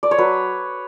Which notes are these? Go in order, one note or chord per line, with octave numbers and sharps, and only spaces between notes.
D5
C#5
F#3 B4